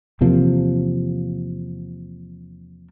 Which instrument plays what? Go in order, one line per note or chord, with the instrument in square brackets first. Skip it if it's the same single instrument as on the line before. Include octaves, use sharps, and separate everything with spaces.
[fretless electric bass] E2 C3 F3 A#3